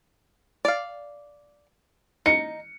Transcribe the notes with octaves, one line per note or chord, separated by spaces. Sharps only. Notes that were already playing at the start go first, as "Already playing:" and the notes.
D5 F5
D#4 C#7